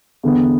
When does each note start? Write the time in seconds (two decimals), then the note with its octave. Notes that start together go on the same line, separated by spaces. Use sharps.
0.23 E2 D3 B3